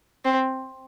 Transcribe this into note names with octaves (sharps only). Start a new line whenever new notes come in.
C4